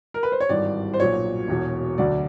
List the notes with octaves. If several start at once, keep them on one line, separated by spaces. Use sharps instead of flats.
A#4
B4
C5
C#5
G#1 G2 E3 D5
C5
B1 A#2 F#3 C#5
E1 E2 B2
D2 D3 F#3 D5